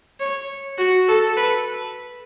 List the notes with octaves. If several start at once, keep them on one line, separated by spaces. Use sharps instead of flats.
C#5
F#4
A4
B4